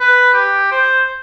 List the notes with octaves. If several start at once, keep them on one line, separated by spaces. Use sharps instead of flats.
B4
G4
C5